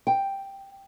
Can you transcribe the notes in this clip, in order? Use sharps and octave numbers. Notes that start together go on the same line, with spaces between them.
G5